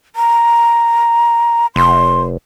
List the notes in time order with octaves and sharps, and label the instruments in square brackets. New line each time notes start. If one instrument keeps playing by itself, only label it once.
[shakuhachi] A#5
[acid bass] F1 [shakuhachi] C6